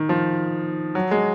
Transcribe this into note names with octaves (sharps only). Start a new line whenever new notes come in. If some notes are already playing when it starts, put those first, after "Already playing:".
Already playing: D#3
F3
F#3
G#3